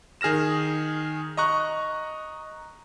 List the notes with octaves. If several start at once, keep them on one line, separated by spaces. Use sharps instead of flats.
D#3 G#4 F6 A#6 E7
D#5 A#5 C#6 F#6